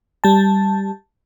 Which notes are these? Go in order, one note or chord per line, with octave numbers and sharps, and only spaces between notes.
G3 A5